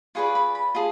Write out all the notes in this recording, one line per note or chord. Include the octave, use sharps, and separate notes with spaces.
F4 G#4 B4 D5 C#6
B5
B5
F4 G#4 A5